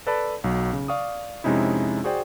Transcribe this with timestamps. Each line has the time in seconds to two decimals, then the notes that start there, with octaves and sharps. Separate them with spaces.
0.07 A4 B4 D5 A5 B5
0.44 B1 F#3
0.73 C#3
0.88 D5 F5 C#6 D#6
1.44 F2 C3 G#3 C#4 D#4 E4
2.04 F#4 G#4 C5 D5 G5